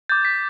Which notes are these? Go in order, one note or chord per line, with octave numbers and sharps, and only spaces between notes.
D6 G6 A6
B6